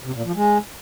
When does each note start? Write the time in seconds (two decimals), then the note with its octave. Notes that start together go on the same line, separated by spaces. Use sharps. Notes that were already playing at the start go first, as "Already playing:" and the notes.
0.04 C3
0.14 A#2
0.25 F3
0.35 G#3